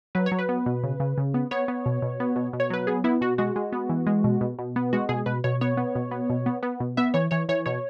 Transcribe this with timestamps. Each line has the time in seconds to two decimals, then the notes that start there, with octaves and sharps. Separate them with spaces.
0.15 F#3 B4
0.26 C#5
0.32 F#3
0.38 B4
0.49 B3
0.66 B2
0.83 C#3
1.00 C#3
1.18 C#3
1.34 B3
1.51 B3 C#5
1.68 B3
1.86 B2
2.02 B2
2.20 B3
2.36 B2
2.53 B2
2.60 C#5
2.70 F#3 B4
2.87 B3 G#4
3.04 B3 E4
3.21 B2 F#4
3.38 G#3 F#4
3.56 G#3
3.72 B3
3.89 E3
4.06 G#3
4.24 B2
4.41 B2
4.59 B2
4.76 B3
4.93 G#3 F#4
5.09 B2 G#4
5.26 B2 B4
5.44 B2 C#5
5.61 B3 C#5
5.77 B3
5.95 B2
6.11 B3
6.30 B2
6.46 B3
6.63 B3
6.80 B2
6.97 B3 E5
7.14 E3 C#5
7.31 E3 C#5
7.49 E3 C#5
7.66 B2 C#5